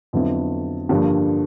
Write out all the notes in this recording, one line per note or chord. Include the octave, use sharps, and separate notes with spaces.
F2 D3 F#3 B3 E4
G2 D3 F3 A#3 D4